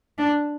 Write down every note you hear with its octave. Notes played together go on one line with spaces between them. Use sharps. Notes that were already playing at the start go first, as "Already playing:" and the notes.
D4